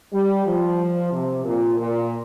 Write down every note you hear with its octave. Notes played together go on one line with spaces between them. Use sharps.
G3
F3
C3
A#2
A#2